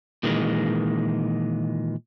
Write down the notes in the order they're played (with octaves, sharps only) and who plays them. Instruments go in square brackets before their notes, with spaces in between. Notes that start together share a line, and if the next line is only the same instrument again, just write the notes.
[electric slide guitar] A#2 D#3 E3 G#3